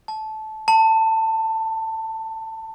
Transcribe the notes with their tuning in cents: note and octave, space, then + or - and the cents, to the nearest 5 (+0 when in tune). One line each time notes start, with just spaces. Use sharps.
A5 -20
A5 +20